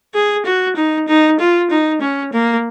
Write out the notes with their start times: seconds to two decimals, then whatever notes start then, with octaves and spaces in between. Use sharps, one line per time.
0.14 G#4
0.46 F#4
0.76 D#4
1.08 D#4
1.39 F4
1.70 D#4
2.01 C#4
2.33 A#3